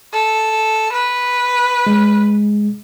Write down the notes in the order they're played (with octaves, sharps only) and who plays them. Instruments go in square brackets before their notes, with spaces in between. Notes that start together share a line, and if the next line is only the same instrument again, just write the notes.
[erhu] A4
B4
[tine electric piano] G#3